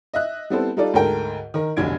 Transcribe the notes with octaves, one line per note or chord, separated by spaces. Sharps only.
D#5 E5 F#6
G3 B3 C4 E4 A4 C5
G3 D#4 F4 A4 D5
D2 G#2 A4 A#4 G5
D#3 A#4
F1 B1 D3 G#6 D7